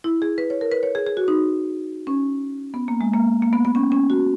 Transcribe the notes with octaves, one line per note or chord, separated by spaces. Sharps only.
E4
G#4
B4
C#5
A#4
B4
C#5
G#4
G#4
F#4
D#4
C#4
B3
A#3
G#3
A#3
A#3
B3
B3
C#4
C#4
F#4